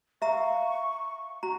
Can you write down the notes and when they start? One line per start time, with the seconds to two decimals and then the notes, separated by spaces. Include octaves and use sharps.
0.22 E5 F5 A#5 C#6 E6
1.43 F#4 A#5